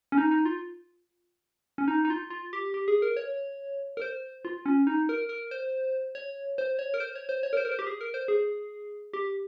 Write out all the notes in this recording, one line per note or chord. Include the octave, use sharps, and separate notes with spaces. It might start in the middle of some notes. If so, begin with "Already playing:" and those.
C#4
D#4
D#4
F4
C#4
D#4
D#4
F4
F4
G4
G4
G#4
A#4
C#5
A#4
C5
F4
C#4
D#4
A#4
A#4
C5
C#5
C5
C#5
A#4
C5
C#5
C5
C#5
A#4
C5
A#4
C5
G4
G#4
A#4
C5
G#4
G4